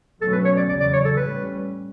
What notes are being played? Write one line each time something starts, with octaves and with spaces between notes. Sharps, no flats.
B2 F#3 A3 C#4 A4
B4
C#5
D5
E2 C#3 F#3 D5
D5
C#5
A4
A2 G3 C#4 B4